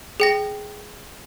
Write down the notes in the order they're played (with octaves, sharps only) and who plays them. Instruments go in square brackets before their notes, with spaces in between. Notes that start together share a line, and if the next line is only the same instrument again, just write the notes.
[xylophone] G#4 G5 A#6